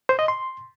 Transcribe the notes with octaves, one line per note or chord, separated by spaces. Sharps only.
C5
D#5
C6